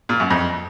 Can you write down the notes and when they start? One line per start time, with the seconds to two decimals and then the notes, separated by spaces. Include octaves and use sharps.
0.09 A#2
0.20 F#2
0.30 F2